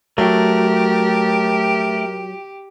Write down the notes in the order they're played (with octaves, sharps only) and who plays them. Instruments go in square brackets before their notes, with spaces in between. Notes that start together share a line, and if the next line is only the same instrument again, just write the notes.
[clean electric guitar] F#3 [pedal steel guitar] A3 [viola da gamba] G4 [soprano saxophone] A#4